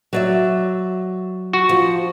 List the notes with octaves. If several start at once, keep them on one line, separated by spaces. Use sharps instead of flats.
F#3 D5 E5
F#4
F3